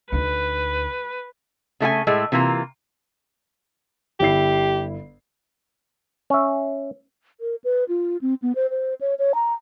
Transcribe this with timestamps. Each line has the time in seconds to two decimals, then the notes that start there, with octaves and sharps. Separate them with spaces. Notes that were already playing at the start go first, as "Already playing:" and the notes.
0.12 D2 D#4 B4
1.80 C#3 A3 E4 G#5
2.07 A2 G#3 A3
2.32 C3 E3 A#3 F4 A#5
4.20 G1 E4 G4 C7
6.30 C#4 E5
7.41 A#4
7.64 B4
7.88 F4
8.22 C4
8.42 B3
8.55 C5
8.70 C5
9.01 C#5
9.19 C#5
9.35 A#5